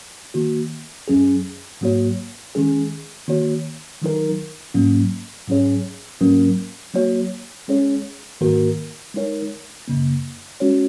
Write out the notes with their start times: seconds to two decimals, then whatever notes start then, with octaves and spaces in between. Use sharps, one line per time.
0.34 D#3 A#3 F#4
1.08 F#2 F#3 C#4 G#4
1.81 G#2 F#3 A#3 F#4 C#5
2.55 D#3 G#3 C#4 G#4
3.28 D#3 A#3 F#4 C#5
4.02 D#3 F#3 D#4 A#4
4.74 G#2 F#3 A#3 C#4
5.48 G#2 F#3 C#4 G#4 C#5
6.21 G#2 F#3 A#3 C#4 A#4
6.94 F#3 A#3 F#4 C#5
7.68 G#3 C#4 G#4 C#5
8.41 G#2 D#3 A#3 F#4 A#4
9.14 G#3 D#4 A#4 C#5
9.87 F#2 C#3 A#3
10.60 G#3 C#4 F#4 C#5